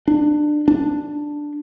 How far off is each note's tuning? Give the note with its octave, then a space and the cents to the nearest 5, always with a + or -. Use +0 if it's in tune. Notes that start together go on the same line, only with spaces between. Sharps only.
D4 +25
D4 +5